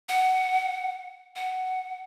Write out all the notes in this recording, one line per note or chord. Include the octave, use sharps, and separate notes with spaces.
F#5
F#5